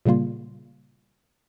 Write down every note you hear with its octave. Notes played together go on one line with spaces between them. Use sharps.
A#2 C#3 G3 A#3 F4